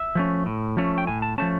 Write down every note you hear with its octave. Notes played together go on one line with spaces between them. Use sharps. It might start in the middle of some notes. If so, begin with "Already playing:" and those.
Already playing: E5
F3 A3 C#4
A2
F3 A3 C#4
G5
A2 G#5
A5
F3 A3 C#4 A5